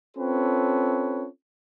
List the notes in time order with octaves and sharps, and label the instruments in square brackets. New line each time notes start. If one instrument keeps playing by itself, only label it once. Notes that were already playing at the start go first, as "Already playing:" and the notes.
[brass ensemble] C4 C#4 F4 A4 B4 C#5